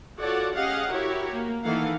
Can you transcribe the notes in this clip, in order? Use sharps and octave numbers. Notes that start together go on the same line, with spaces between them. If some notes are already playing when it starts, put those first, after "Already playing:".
F4 F#4 A4 C#5 D5 F#5
C#4 G4 G#4 D#5 F5 F#5
E4 F#4 G4 A#4 C#5
A#3
D#3 E3 A#3 A4 F5 F#5